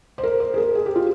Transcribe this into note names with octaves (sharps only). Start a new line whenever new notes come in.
C5
A#4
C5
G#4
A#4
G#4
G4
F4